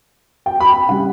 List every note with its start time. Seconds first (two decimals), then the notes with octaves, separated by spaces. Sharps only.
0.46 G5
0.60 B5
0.73 G5
0.88 C#3 G3 F#5